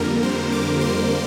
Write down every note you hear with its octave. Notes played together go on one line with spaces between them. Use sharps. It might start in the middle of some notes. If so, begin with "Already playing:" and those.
Already playing: F2 D3 G3 A#3 A#4
C5
D6
C6